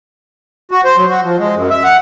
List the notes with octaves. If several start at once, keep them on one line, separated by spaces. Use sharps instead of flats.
F#4
C5
F#3
F#4
F3
G#3
F#2
E5
F#5